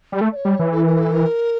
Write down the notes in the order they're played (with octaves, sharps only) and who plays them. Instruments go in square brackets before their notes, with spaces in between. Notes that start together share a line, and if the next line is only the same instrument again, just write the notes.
[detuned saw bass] G3
A3
[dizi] D5
C#5
[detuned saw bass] G3
E3
[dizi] A4
A#4
A4
A#4